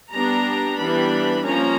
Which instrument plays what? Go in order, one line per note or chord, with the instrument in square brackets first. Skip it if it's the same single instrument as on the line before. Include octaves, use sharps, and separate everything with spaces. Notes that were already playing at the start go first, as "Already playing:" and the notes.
[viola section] G3 B3 D4 A#5
E3 G3 B3 D4 B5
F3 A#3 C#4 A#5